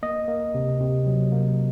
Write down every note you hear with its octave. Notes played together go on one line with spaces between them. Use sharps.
A#3 D#5
A#3
C3
C3
F#3
A#3